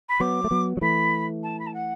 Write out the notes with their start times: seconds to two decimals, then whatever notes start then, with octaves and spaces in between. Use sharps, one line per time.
0.09 B5
0.20 F#3 B3 D6
0.44 A3
0.51 F#3 B3
0.77 F#3
0.81 E3 A3 B5
1.43 A5
1.59 B5
1.66 A5
1.74 F#5